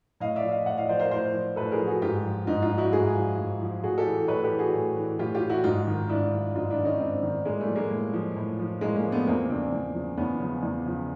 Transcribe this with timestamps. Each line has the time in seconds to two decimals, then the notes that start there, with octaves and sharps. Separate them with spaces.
0.20 A2 D#5 F5
0.36 D5 E5
0.43 F3
0.51 D#5 F5
0.66 A2 E5 F#5
0.77 D#5 F5
0.89 F3 C5 D5
1.00 A#4 C5
1.11 A2 A#4 C5
1.34 F3
1.56 A2 A4 B4
1.71 G#4 A#4
1.79 F3
1.87 F#4 G#4
2.02 G#2 F4 G4
2.25 F3
2.47 G#2 D#4 F4
2.62 D#4 F4
2.70 F3
2.77 E4 F#4
2.92 G#2 F#4 G#4
3.15 F3
3.39 G#2
3.61 F3
3.83 A2 F#4 G#4
3.98 G4 A4
4.06 E3
4.28 A2 B4 C#5
4.43 G4 A4
4.52 E3
4.59 F#4 G#4
4.74 A2
4.97 E3
5.19 A2 F4 G4
5.35 F4 G4
5.42 E3
5.50 E4 F#4
5.64 G#2 D#4 F4
5.87 D#3
6.09 G#2 D4 E4
6.33 D#3
6.55 G#2 D#4 F4
6.70 D4 E4
6.78 D#3
6.85 C#4 D#4
7.00 G#2 C4 D4
7.23 D#3
7.45 A2 G#3 A#3
7.61 G3 A3
7.68 F3
7.75 G#3 A#3
7.91 A2
8.13 F3
8.36 A2
8.59 F3
8.81 A2 G#3 A#3
8.96 G#3 A#3
9.04 F3
9.11 A3 B3
9.27 E2 A#3 C4
9.49 C#3 F3 C4 D4
9.72 E2
9.95 C#3 F3
10.17 E2 B3 C#4
10.40 C#3 F3
10.63 E2
10.86 C#3 F3